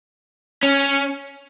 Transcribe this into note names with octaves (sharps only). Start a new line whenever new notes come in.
C#4